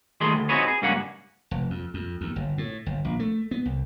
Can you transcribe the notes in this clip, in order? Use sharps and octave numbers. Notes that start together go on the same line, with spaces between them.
D#3 G3 A3 G#4 C6
D2
C4 D#4 F#4 G#4 B4 C#5
G#4
C#2 G2 G3 A#3 C#4 F#5
F1
F2
F2
D#2
G1
A2
G1
A#1
A3
B3
C2